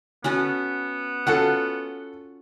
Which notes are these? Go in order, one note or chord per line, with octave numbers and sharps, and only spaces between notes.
B3 C#4 F#4 A4
C#4 F4 F#4 A4 F#5